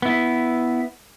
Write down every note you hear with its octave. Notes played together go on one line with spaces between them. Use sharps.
B3 E4